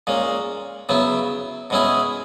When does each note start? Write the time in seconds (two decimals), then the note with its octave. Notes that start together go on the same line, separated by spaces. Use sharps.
0.07 A#2 G#3 C#4
0.89 C#3 F#3 B3 E4
1.70 B2 G#3 C#4 E4 G#4